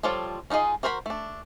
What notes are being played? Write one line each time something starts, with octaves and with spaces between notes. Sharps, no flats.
F3 G3 F4 A4 C#5
C#4 D#4 F4 G#4 D#5
F#4 A#4 C5 A#5 B5
A3 D4